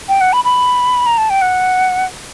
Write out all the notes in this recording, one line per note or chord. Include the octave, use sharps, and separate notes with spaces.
G5
F#5
B5
B5
A#5
A5
G5
F#5